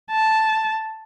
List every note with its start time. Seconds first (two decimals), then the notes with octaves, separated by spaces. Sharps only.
0.11 A5